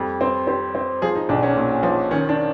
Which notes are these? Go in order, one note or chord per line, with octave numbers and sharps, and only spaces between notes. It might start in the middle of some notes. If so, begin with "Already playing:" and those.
Already playing: F2 G3
C4
C4 G4
C4
F3 G#4
D#4
B1 D4
C#4
A#2
F3
D#3 C#4
D4